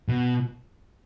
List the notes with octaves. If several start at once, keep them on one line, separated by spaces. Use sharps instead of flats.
B2